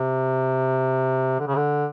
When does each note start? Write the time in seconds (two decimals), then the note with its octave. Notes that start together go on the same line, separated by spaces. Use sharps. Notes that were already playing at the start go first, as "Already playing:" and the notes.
Already playing: C3
1.40 D3
1.47 C#3
1.56 D3